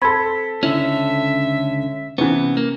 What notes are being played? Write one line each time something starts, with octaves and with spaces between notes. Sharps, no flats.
C4 A4 B5 C6 G#6 B6
C#2 D3 C#4 E4 E5
C3 E3 B3 C#4
A#3